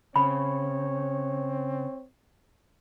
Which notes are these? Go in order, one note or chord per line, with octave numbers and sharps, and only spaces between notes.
C#3 C4 C#5 B5